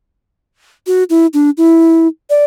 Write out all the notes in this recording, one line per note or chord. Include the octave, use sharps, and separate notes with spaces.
F#4
E4
D4
E4
D5